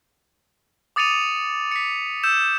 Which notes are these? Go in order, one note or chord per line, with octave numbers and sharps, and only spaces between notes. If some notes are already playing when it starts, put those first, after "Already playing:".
D6 D#6 A6 C#7 D#7 F7
B6 C#7
E6 G6 E7